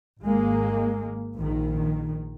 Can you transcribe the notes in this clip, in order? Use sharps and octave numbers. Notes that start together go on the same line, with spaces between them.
G#1 G#3 A#3
A#1 D#3